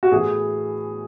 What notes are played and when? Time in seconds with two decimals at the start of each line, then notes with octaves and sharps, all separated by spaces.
0.03 F#4
0.11 A2 E3 G#4